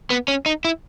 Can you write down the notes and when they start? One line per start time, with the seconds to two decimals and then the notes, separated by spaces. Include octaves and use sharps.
0.10 B3
0.28 C#4
0.46 D#4
0.65 E4